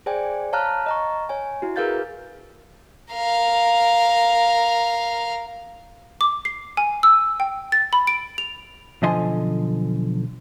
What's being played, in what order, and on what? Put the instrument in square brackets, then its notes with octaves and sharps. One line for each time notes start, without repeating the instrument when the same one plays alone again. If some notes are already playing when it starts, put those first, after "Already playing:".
[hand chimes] G#4 C5 D5 G5 G#5
C#5 F5 A5 A#5 F6 F#6
D#5 A#5 C#6
C#5 G#5
E4 F#4
G#4 A#4 B4 F5 G6 A6
[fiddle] A#4 F5
[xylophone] D6
C7
G#5
E6
G5
A6
B5
D7
F7
[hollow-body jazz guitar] B1 D3 F3 D#5 G#5 C6